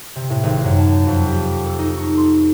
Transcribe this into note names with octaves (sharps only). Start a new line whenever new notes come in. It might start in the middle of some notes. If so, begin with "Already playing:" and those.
C3
A2
G#1
F#2
A5
F2
G4
A4
D#4
C#6
C6